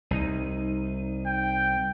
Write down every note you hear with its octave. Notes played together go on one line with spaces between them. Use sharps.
C2 D#4 D#7
G5